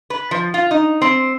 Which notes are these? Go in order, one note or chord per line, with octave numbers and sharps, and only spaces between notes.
B4
F3
F4
D#4
C4